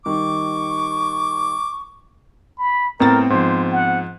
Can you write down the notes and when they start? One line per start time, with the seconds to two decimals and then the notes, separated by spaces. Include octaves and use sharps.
0.06 D#3 G3 C#6 D6
2.58 B5
3.00 A2 B3 C4 A#4 A6
3.30 G#2 F3 C5
3.72 F#5